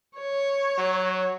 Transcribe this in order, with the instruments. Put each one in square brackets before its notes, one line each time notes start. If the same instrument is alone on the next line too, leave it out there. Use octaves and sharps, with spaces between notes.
[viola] C#5
[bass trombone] F#3